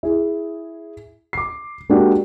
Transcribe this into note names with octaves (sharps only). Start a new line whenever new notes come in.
E4 G#4
D6 C7
G#3 A#3 D4 F#4 G4